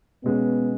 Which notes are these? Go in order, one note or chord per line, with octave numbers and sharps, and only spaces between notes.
B2 G#3 B3 C#4